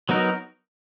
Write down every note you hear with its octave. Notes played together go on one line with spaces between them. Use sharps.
F#3 B3 D#4 F#4 A#4